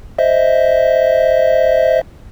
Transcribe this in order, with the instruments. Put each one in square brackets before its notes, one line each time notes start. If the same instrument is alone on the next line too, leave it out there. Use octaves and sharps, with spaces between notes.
[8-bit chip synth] C5 D#5 E5